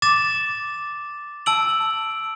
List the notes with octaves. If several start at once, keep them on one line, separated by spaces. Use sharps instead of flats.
D6 A6 E7
A5 E6 D7 F#7